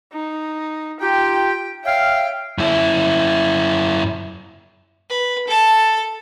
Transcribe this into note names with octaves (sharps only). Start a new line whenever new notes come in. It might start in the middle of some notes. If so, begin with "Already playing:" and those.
D#4
D#4 F4 G4 G5
C#5 E5 F5 G5
F#2 E4
B4
A4 A5